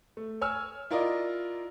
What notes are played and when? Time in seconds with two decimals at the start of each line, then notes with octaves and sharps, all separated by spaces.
0.17 A3
0.41 C#5 G#5 E6 F6
0.91 E4 F4 A#4 D5 D#5